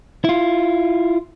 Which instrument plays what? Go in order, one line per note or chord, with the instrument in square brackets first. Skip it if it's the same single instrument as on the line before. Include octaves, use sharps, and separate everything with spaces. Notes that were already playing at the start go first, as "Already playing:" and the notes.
[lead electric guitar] E4 F4